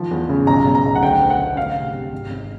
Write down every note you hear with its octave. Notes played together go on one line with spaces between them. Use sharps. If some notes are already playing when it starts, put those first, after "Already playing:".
Already playing: D#3 F3
E2
C#3
B1 A#5
B1
A#5
B1
F#5
D2 G5
D2
F#5
D2
D2 F5
C3
C3
G#1
G#1